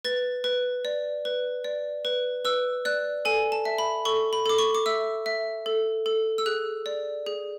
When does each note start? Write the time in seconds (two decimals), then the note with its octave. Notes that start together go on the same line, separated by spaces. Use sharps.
0.05 B4 A6
0.44 B4
0.85 D5
1.25 B4
1.64 D5
2.05 B4
2.45 B4 E6
2.85 D5 F#6
3.25 A4 G#5
3.52 A5
3.65 E5
3.78 B5
4.05 A4 C#6
4.33 B5
4.46 A4 D6
4.58 C#6
4.75 D6
4.86 E5 E6
5.26 E5
5.66 A4
6.06 A4
6.38 E6
6.46 G#4 F#6
6.86 D5
7.26 G#4